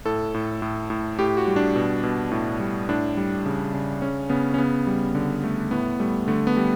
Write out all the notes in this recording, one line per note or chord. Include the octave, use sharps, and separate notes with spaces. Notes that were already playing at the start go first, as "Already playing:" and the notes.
A2 A4
A2
A2
A2
A2 G4
F#4
G3
D4
B2
B2
A2
G3
A2 D4
G3
C#3
C#3
C#3 C#4
C#3 B3
C#4
C#3 B3
G3
D3
A3
A2 B3
G3 A3
D3 A3
B3
G3